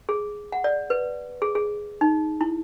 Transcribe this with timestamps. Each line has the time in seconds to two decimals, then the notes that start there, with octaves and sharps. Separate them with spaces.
0.09 G#4
0.52 F#5
0.64 D5
0.90 B4
1.42 G#4
1.55 G#4
2.01 D#4
2.41 E4